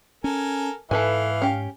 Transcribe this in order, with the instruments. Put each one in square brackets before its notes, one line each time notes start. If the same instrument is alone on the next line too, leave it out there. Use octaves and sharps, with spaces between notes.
[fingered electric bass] C#4 [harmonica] A4 A#4 G#5
[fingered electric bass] G#2 [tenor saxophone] E3 [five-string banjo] A4 B4 G#5 [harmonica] F5
[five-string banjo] C#4 G4